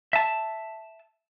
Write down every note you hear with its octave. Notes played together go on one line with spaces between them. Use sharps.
E5 A5